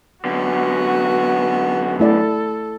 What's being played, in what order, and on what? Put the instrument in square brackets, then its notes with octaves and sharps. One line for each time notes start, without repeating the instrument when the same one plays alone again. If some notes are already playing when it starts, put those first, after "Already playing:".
[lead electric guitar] F#2 D3 [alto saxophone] B3 [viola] F#4
[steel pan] A3 E4 D5 [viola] A4